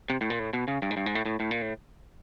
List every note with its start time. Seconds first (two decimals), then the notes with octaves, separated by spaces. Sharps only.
0.10 C3
0.21 A2
0.30 A#2
0.39 A2
0.53 B2
0.68 C#3
0.82 G2
0.91 G#2
0.97 G2
1.06 G#2
1.15 A2
1.26 A2
1.40 A2
1.51 A#2
1.62 A2